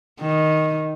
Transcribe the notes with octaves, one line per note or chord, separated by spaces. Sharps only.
D#3